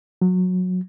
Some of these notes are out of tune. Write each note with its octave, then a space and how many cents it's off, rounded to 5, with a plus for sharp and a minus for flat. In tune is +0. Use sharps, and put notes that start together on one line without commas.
F#3 -20